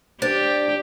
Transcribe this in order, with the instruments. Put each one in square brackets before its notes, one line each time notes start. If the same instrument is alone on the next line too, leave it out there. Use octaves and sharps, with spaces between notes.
[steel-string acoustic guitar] D4 [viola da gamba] G4 [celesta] C5 A6